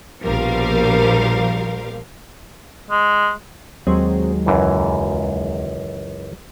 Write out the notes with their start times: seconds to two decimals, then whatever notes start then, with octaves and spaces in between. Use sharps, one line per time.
0.22 A#1 B2 F3 G3 A#4 F5
2.90 G#3
3.87 D#2 F#3 G#3 C4
4.46 C#2 F#2 E3